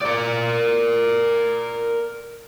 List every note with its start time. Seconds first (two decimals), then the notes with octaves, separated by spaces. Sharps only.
0.02 A#4 D5